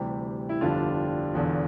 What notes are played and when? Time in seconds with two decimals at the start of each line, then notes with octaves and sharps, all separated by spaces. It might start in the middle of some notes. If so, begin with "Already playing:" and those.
Already playing: D2 C3 E3 G3
0.49 E4
0.61 G1 F2 D3 G3 D4 F4
1.34 E1 E2 D3